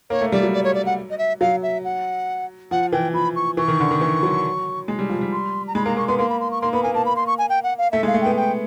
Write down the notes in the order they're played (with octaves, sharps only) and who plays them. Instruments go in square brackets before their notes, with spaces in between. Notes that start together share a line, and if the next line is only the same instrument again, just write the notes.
[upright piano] A#3 [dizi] C#5
[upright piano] A3
[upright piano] G3 [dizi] D5
[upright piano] F#3
[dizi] D5
C#5
D5
F#5
D#5
E5
[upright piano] F#3 [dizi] F5
[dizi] E5
F#5
[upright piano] F3 [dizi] F#5
[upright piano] E3 [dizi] G5
[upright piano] F3 [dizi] B5
[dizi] C#6
[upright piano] E3 [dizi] C#6
[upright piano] D#3
D3
D#3
E3
F#3
G#3
G3
F3
G3
[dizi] C6
A#5
[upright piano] G#3 [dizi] B5
[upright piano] A#3 [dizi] A#5
[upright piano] A#3 [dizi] C#6
[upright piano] B3 [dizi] C6
[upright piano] A#3 [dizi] C6
[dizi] B5
C6
C#6
[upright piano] A#3 [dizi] C6
[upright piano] B3 [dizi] B5
[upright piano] A#3 [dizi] G#5
[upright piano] A#3 [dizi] A5
[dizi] B5
C6
C#6
G#5
G5
F#5
F5
[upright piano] A3 [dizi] E5
[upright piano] G#3 [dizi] F5
[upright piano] A3
[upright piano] B3 [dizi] G5
[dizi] G5